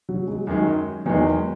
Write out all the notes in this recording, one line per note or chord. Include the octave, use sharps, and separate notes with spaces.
F#3
G#3
F#2 D#3 F#3 G#3
E2 D#3 F#3 G#3